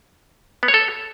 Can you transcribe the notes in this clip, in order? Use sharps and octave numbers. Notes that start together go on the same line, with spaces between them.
B3
C#5
A4